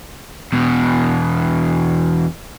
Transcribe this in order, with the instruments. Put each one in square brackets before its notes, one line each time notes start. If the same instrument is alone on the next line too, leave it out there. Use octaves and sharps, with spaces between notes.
[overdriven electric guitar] E2 B2